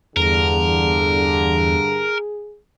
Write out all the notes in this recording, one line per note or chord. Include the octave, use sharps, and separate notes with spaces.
E2 G2 D3 G#4 A#4